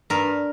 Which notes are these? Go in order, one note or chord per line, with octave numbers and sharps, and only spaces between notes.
G2 A#4